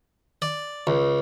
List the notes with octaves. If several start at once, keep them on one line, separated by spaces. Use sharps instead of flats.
D5
C#2